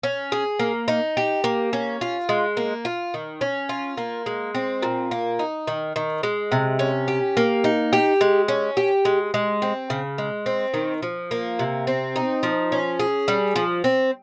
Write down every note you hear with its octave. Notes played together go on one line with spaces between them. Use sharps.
C#4
G#4
A#3
D#4
G4
A#3
C#4
F4
G#3
A#3
F4
D#3
C#4
F4
A#3
G#3
C4
A#2
A#3
D#4
D#3
D#3
G#3
C3
C#4
G4
A#3
D#4
G4
G#3
C#4
G4
G#3
G#3
C4
C#3
G#3
C4
D#3
F3
A#3
C3
C4
D#4
F3
C#4
G#4
G3
F3
C4